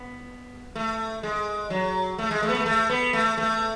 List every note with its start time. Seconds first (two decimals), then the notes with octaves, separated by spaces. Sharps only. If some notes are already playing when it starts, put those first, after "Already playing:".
Already playing: B3
0.75 A3
1.23 G#3
1.70 F#3
2.18 A3
2.31 G#3
2.43 A3
2.49 B3
2.55 A3
2.66 A3
2.90 B3
3.13 A3
3.38 A3